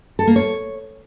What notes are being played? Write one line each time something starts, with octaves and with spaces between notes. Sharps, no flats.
A4
A#3
C#5